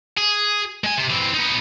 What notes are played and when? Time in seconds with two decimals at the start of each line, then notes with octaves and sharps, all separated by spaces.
0.18 G#4
0.84 G#3 G#5
0.97 C3
1.10 E3 C4
1.34 B3 D#4